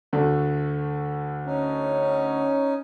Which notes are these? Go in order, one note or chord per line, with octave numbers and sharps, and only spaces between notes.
D2 D3 A3
C#4 D#4